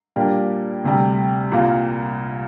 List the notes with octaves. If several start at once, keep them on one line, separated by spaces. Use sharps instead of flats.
A#2 G3 A#3 D4 G4
D2 C3 G3
C2 A#2 A#3 F4